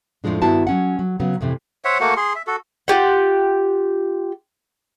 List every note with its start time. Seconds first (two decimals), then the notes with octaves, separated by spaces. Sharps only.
0.24 F2 A2 D#3 F3 G#3 D4
0.42 G2 D#3 B3 E4 F#4 A5
0.67 F#3 C#4 F#5
0.99 F#3
1.20 C#3 F#3 B3 C#4
1.41 F2 A2 C3 E3
1.85 C5 C#5 E5 F#5
2.00 A3 A#3 F#4 F#5
2.17 G#4 C6
2.35 E5
2.47 F#4 A4
2.88 F4 G4 F#5